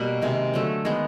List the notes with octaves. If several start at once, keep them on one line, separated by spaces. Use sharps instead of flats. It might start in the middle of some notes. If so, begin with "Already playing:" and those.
Already playing: B2 G3 A#3 B5
C3 D#3 G#3
D3 F#3 A3
D#3 G#3 B3